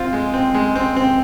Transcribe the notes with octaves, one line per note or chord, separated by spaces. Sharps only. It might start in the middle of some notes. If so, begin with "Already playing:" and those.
Already playing: C4 F4
G#3
C4
G#3
C4
C4